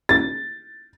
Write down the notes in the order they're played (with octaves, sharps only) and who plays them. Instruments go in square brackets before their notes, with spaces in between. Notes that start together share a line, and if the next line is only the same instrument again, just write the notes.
[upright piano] A6